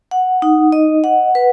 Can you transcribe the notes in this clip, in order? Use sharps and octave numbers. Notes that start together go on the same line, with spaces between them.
F#5
D#4
D#5
F#5
B4